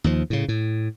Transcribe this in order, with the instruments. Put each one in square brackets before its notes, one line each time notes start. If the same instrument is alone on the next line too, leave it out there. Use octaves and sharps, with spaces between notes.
[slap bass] D#2 F3
A2 C#3
A2